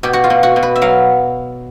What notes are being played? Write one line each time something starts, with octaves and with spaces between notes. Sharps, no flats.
B2 G4
F#4
F4
B2
F#4
B2
B4
E5
F#3 F5